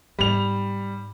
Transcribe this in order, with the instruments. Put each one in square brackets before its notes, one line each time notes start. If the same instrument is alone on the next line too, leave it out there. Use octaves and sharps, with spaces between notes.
[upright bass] G#2 B3 [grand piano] G3 F7